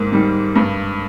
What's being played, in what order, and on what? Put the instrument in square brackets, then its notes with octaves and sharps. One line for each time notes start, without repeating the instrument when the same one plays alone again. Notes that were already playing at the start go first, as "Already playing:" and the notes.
Already playing: [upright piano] G#2 A#3
D#3 G3
G2